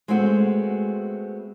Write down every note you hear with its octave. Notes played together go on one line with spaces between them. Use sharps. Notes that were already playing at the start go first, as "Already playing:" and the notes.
G#3 A3 B3 C4 F#4